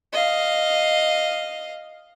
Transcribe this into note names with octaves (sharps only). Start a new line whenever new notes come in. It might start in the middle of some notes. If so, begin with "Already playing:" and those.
D#5 F5